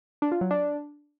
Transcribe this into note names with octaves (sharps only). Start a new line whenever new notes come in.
D4
F4
F#3
D4